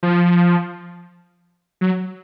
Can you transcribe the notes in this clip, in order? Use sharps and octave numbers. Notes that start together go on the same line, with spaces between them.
F3
F#3